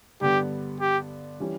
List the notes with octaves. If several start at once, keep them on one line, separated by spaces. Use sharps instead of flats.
G2 D3 G3 B3 G4
G4
E3 G3 C#4 G4